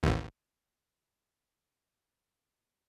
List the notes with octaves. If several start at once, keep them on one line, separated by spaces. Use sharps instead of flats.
A1 D#2